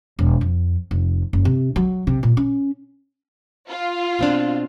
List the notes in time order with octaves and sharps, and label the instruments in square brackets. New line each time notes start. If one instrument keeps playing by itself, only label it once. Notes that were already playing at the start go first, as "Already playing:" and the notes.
[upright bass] E1
F2
F1
F#1
C3
F#3
C3
A#2
C#4
[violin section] F4
[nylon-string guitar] B2 C4 D4